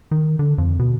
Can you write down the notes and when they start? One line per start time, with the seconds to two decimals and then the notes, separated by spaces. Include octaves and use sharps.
0.11 D#3
0.39 D3
0.58 F2
0.79 B2